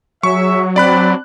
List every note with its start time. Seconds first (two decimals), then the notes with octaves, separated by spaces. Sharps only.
0.23 F#3 G#4 C#5 E5 C#6
0.76 C4 D4 D5 B5 F#6